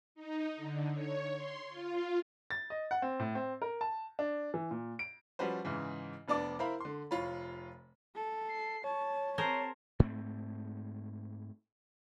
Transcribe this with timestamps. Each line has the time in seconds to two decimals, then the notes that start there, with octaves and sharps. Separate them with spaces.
0.15 D#4
0.56 D3
0.92 C#5
1.34 C6
1.69 F4
2.51 A6
2.70 D#5
2.91 F#5
3.02 C4
3.19 A2
3.35 C4
3.62 A#4
3.81 A5
4.19 D4
4.54 E3
4.71 A#2
4.99 D7
5.39 F3 G3 C#4 F#4 B4 C5
5.65 G#2 C#3 E3
6.28 F1 B3 D4 D5 D6
6.59 E4 A#4 C5 F5 B5
6.81 D3 C6
7.11 F1 F4 C#5 B5
8.15 A4
8.49 C7
8.84 C#5 A5
9.38 C4 G#4 A#4 C5 A5
10.00 G#2 A3 C4